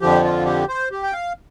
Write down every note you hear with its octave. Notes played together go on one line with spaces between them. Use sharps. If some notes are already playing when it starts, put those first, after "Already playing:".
F2 D3 F3 G4
F4
G4
C5
G4
G5
F5